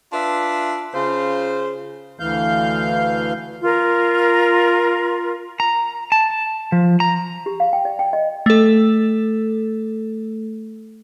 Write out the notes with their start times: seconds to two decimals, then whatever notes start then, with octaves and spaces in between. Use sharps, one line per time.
0.12 D4 F4 B4 E5
0.94 C#3 F4 C5
2.20 D2 E3 F5 G6
3.62 F4 A#4
5.60 A#5
6.12 A5
6.72 F3
7.00 A#5
7.46 G4
7.60 F5
7.73 G5
7.85 D5
7.99 G5
8.13 D#5
8.46 A3 A4